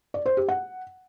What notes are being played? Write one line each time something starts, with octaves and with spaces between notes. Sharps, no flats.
D5
C5
G4
F#5